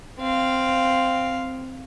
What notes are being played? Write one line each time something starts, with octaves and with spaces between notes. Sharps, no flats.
C4 F5